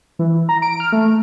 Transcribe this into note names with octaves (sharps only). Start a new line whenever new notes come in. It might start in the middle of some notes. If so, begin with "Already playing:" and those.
E3
A#5
D7
F6
A3